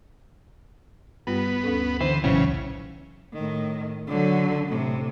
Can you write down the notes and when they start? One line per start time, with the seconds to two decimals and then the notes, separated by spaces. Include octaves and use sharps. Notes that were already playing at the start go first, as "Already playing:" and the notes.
1.27 G2 G3 B3 F4
1.64 D2 C#4 A4
2.01 D3 E3 C5
2.24 A#1 D#2 A2 C#3 E3 F#3 C#4
3.33 A2 D#3
4.07 D3 F#3
4.68 A2 C3